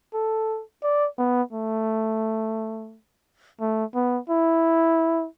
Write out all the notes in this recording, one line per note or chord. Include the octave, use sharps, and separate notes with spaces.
A4
D5
B3
A3
A3
B3
E4